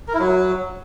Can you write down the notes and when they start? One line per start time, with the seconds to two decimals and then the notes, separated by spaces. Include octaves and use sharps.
0.08 A#4
0.14 E4
0.20 F#3